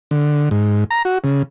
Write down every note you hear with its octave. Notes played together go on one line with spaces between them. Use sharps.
D3
G#2
A#5
F#4
C#3